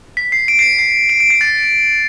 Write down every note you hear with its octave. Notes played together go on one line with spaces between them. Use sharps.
B6
C7
D7
C7
C7
D7
D7
C7
A6